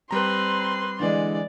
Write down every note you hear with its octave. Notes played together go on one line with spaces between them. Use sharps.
G3 C4 B4 A#5 C6
D3 E3 G#3 D5